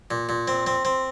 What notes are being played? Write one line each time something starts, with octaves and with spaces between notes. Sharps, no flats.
A#2
A#2
C4
C4
C4